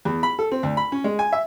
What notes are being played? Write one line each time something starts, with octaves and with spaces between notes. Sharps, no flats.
E2
B5
A4
C4
D2
B5
C#4
G#3
G#5
E5